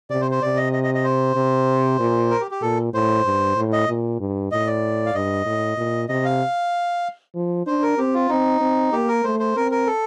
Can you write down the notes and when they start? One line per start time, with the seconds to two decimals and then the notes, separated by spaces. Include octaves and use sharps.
0.10 C3 D5
0.21 C5
0.31 C5
0.42 C3 D5
0.57 D#5
0.73 D#5
0.84 D#5
0.94 D#5
1.04 C5
1.36 C3
1.99 A#2
2.31 A#4
2.41 G4
2.51 G4
2.62 A#2 A4
2.94 A2 C5
3.25 G2
3.56 A2
3.73 D#5
3.88 A#2
4.20 G2
4.52 A2 D#5
4.67 D5
5.06 F5
5.14 G2 D#5
5.46 A2
5.77 A#2
6.09 C3 D#5
6.25 F5
7.35 F3
7.66 D4 C5
7.83 A#4
7.98 C4 G4
8.14 F4
8.29 C4 D#4
8.61 C4
8.92 A#3 G4
9.08 A#4
9.24 A3 C5
9.40 C5
9.56 C4 A#4
9.71 A#4
9.87 A4